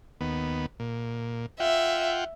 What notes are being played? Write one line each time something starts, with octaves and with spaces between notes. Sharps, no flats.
D#2 B3
A#2
F4 E5 F#5 G5